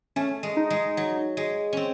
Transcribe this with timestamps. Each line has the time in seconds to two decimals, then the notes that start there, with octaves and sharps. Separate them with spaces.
0.16 A3 C#4
0.43 G#3
0.57 D#4
0.70 G#3
0.97 F#3
1.37 G#3
1.73 C4 C#4